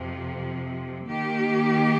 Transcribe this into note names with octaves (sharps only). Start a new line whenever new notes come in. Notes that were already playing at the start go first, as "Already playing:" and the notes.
Already playing: F2 C3 F3
D#3 A#3 G4